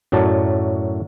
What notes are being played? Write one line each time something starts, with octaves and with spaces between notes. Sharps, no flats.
F#2 A2 F#3 D5 A5